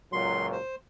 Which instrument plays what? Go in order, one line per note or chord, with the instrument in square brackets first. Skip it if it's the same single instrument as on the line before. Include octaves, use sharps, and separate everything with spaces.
[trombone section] C#2 A#2 F#3 [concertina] C6
[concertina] C5